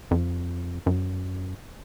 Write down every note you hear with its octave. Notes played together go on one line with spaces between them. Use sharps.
F2
F#2